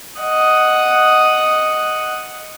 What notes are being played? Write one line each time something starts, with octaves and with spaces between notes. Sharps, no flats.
D#5 F#5